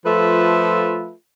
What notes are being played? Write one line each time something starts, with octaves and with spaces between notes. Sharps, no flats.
F3 A3 F4 A4 B4 E5